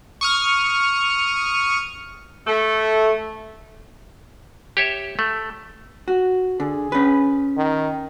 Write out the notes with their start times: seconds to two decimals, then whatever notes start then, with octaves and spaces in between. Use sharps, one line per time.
0.21 C#6 D#6 F6
2.45 A3
4.77 G4 C#5 E5
5.19 A3
6.08 F#4
6.60 D3 G#4
6.92 C#4 B4
7.57 D#3